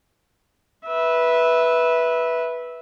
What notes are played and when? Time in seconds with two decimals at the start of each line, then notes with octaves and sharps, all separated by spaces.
0.87 B4 E5